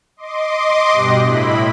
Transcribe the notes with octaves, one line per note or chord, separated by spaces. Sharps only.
D#5 C6 D6
G2 B2 G4 F#6 A#6
A2 E4 B5